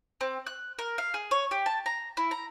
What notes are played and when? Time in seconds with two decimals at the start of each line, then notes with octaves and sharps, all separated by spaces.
0.21 C4
0.46 F#6
0.79 A#4
0.98 F5
1.14 G#4
1.31 C#5
1.51 G4
1.66 A5
1.86 A#5
2.17 E4
2.31 A#5